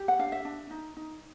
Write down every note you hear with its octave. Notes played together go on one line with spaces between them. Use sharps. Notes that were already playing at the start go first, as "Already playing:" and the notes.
Already playing: G4
F#5
D4 F5
E5
D4
D#4
D#4